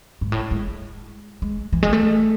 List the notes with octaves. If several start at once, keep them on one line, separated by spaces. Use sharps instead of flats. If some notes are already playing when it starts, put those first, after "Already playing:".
G#2
A2
G#3
G#3
E3
G#3
A3